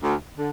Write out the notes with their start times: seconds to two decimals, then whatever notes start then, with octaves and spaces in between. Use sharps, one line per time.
0.02 D2
0.37 D3